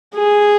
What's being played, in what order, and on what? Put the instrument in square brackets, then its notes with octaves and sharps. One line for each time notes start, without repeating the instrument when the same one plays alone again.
[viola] G#4